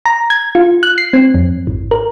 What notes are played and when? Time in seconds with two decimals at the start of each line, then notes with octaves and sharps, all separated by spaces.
0.06 A#5
0.30 G#6
0.55 F4
0.83 F#6
0.98 C7
1.13 C4
1.34 F2
1.67 G#1
1.91 A#4